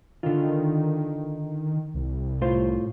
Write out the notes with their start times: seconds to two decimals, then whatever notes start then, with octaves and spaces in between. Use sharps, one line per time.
0.23 D3 D#3 F4
1.95 C2
2.41 A2 F4 C5